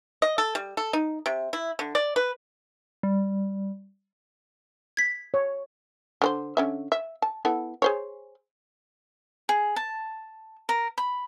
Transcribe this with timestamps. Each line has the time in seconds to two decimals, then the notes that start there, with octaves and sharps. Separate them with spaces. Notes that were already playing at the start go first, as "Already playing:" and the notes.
0.22 D#5
0.38 A4
0.55 G3
0.77 A4
0.93 D#4
1.26 C3
1.53 E4
1.79 D3
1.95 D5
2.16 B4
3.03 G3
4.97 G#6 B6
5.34 C#5
6.22 D3 C#4 C5
6.57 D3 C#4 E5
6.92 E5
7.22 A5
7.45 B3 E4 A4
7.82 G#4 C5 C#5
9.49 G#4
9.76 A5
10.69 A#4
10.98 B5